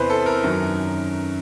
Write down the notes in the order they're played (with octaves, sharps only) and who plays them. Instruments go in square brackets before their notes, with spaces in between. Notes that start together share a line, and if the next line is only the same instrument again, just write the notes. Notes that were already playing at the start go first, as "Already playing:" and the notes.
Already playing: [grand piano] E2 C3 E3 B4 C5
A4
A#4
F#2 D#3 F#3